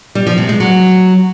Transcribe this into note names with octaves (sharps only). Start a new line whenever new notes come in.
G3
F3
C3
G#3
F#3